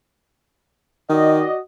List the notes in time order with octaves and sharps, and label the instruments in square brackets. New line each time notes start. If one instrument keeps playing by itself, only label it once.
[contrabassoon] D#3 [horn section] F#4 D5 D#5